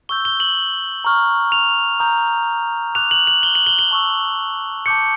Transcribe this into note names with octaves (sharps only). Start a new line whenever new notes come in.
C#6 E6 G6 G7
G7
F#7
A#5 C#6 F6
F7
A#5 D#6 G6
A#5 D6 F#6 F7
F#7
F#7
G7
F#7
G7
G7
A5 C#6 E6
A5 D6 G6 C#7